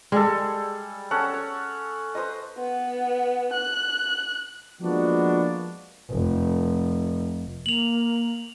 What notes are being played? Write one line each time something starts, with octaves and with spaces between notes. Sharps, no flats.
G3 G#3 G#4 A4
C#4 A4 F#5
C#5
B4 C5 D#5
B3
F#6
F3 G#3 A#3 B3 D4 F#4
F1
A#3 F7 F#7